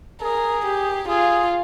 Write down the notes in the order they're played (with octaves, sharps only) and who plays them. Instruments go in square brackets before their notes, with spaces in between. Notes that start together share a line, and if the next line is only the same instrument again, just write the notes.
[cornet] G#4 [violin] A#4
[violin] G4
[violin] F4 [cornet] G#4